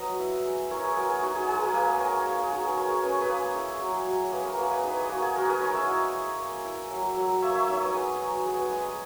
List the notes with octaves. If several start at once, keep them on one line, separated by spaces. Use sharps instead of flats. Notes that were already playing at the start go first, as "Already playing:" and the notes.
Already playing: F#3 B4 D#5
E4
G#3
E4 A#4 C#5
G#4 B4
G#3 F#4 A#4
G#4
D#4 F#4
G#4
G#3 G#4
F#4 A#4 B4
A#3 G#4 B4
A#3 A#4 C#5
A#3 G#4
G#4
D#4 F#4 A#4
G#4 B4
G#3 A#4 C#5
C#4 B4
C#5
G#4 B4
A#3
E4
F#3
F#3
A#3 G#4 B4
F#4 A#4
A#3 G#4 B4
B4 D#5
D#4 G#4 B4
G#4
A#3 F#4
G#4
G#3 F#4 A#4
G#4 B4
D#4 A#4 C#5
C#5 E5
E4 D#5 F#5
E4
A#3
E4
F#3
F#3
A#3 C#5 E5
C#5 E5
D#4 C#5 E5
B4 D#5
B3 G#4 B4
F#3
B3 G#4
G#4 B4
G#3 B4 D#5
G#4